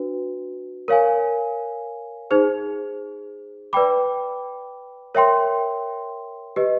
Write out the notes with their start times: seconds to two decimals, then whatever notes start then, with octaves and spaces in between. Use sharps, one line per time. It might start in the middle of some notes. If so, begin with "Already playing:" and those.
Already playing: D4 F#4 B4
0.88 A#4 C#5 F5 G#5
2.31 D#4 G#4 C5
3.73 B4 D5 G5 B5 D6
5.14 A#4 C#5 E5 G5 C6
6.56 G4 B4 D#5